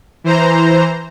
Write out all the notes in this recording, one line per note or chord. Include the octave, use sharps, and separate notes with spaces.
E3 C5 A#5